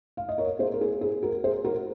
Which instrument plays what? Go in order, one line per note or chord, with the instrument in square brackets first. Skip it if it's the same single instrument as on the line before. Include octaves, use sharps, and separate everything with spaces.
[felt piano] F5
D#5
A#4 C#5
G#4 C5
A#4
G#4
G#4
F#4 A#4
G#4 C5
F#4 A#4